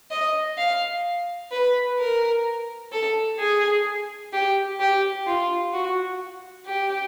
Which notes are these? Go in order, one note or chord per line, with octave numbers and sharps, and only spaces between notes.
D#5
F5
B4
A#4
A4
G#4
G4
G4
F4
F#4
G4